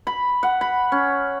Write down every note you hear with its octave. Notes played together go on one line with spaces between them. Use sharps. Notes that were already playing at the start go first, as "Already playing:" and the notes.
B5
F#5
B5
C#4